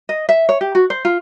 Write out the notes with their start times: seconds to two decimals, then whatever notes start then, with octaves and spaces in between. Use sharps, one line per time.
0.09 D#5
0.29 E5
0.49 C#5
0.61 G4
0.75 F#4
0.90 C5
1.05 F4